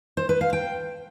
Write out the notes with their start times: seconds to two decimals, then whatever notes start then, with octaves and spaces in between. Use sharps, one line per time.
0.17 C5
0.29 B4
0.41 F5
0.53 G5